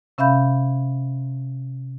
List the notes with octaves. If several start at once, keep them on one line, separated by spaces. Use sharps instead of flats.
C3 C#4 E5 F5 B5 G6